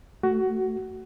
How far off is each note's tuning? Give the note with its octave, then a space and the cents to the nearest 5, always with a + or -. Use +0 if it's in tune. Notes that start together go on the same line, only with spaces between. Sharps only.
A3 +0 F#4 +15